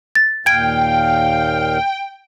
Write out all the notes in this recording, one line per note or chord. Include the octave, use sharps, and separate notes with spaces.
A6
D#2 A#2 F5 G5 G#6 D7